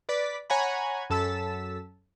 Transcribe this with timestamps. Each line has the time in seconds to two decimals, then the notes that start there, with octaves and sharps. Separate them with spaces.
0.09 B4 D5 B6
0.50 C#5 F#5 G#5 A#5 B5
1.10 F#2 A4 A5 E6 B6